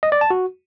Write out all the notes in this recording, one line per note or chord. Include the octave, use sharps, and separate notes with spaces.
D#5
D5
A5
F#4